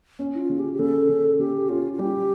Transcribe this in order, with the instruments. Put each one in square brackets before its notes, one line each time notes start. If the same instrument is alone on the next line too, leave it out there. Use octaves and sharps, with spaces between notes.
[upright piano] C#4
[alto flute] E4
F4
[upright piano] C#3
[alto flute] G4
G4
[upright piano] C#3 [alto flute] A4
[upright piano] C#3
[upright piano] C#3 [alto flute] G4
[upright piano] C#4 [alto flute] F4
[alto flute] F4
[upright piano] G3 [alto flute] G4